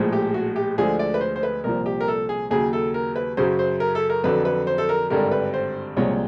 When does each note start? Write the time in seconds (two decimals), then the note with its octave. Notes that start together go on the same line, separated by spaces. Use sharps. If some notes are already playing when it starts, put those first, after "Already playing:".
Already playing: A#1 A2 F3 G#3
0.13 G4
0.34 F#4
0.56 G4
0.78 D2 D3 F3 G#3 G#4
0.99 D5
1.14 B4
1.21 C5
1.36 C5
1.43 B4
1.64 C2 A#2 F3 A#4
1.86 G4
2.01 A#4
2.08 A4
2.29 G#4
2.51 D#2 C#3 F#3 G#4
2.73 A4
2.94 A#4
3.16 B4
3.37 F#2 C#3 F#3 C5
3.59 C5
3.80 A#4
3.95 A4
4.10 A#4
4.24 F2 D3 F#3 B4
4.45 B4
4.67 C5
4.78 A4
4.89 A#4
5.10 G#1 G2 D3 G3 A#4
5.31 B4
5.54 C5
5.97 C2 A#2 F3 G#3 C#5